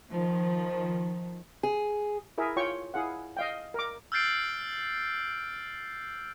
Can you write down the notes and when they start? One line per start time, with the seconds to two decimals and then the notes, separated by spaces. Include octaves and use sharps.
0.12 D#3 F3
1.63 G#4
2.38 E4 G#4 A#4 E5
2.56 F4 C#5 G5 C#6
2.94 E4 G#4 F5 F#5
3.37 D#5 F5 G5
3.74 A#4 D6
4.12 E6 F6 G6 A6 C7 D7